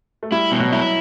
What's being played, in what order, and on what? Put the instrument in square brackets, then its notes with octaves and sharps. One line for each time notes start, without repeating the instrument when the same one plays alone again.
[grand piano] A3
[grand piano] G3 [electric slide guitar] E4
[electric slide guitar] B2
[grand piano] F#3
[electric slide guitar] E4